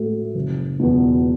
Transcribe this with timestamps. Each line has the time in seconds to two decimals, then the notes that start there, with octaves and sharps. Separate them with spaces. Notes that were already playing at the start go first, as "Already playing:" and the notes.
Already playing: A2 A3 F#4 A4
0.35 F#1
0.80 E2 B2